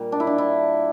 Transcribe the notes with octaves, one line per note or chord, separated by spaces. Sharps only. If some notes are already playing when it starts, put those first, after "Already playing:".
Already playing: A#2 G3 A#3
D4
E4
D4
E4